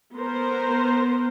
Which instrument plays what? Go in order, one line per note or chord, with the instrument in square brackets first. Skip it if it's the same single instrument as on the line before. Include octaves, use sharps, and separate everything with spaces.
[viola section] B3 A#4 C5